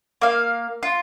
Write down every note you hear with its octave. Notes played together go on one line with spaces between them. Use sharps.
A#3 F5
F4